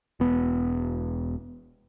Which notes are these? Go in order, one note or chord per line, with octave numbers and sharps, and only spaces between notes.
E1 B3